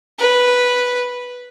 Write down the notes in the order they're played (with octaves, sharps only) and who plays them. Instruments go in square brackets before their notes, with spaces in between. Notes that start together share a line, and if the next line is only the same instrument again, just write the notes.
[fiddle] B4